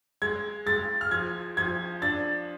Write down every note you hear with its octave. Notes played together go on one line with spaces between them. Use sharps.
G#3 G#6
G#3 A6
F6
F3 G#6
F3 G#6
D4 A6